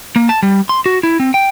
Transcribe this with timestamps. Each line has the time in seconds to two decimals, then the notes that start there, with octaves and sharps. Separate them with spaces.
0.16 A#3
0.29 A5
0.43 G3
0.69 C6
0.86 F#4
1.03 E4
1.20 C4
1.34 G5